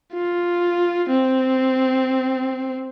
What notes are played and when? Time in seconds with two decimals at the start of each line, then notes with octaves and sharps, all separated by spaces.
0.13 F4
1.09 C4